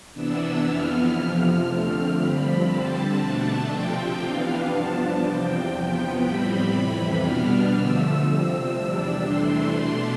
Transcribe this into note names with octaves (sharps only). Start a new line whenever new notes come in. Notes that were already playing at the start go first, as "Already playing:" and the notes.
C3 E3 B3 D4 E6
F2 E3 B3 F6
F2 C3 F3 F6
D3 A3 C4
G2 F3 C4 B5
D3 G3 C4 A5
B2 A3 D4 A5
C3 F3 C4 G5
C3 E3 B3 D4 F5
G2 F3 B3 D4 A5
E2 C3 F3 C4 G5
E2 C3 F3 B3 G5
A2 G3 C4 B5
F2 C3 E3
B2 G3 B3 D4 F6
D3 F3 A3 E6
C3 F3 C4
E2 C3 G3 D4 E6
C3 E3 A3 D4 C6
B2 A3 D4 C6